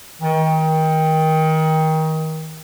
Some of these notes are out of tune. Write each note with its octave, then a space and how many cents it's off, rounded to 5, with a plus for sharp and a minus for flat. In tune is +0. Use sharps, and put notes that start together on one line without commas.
D#3 +25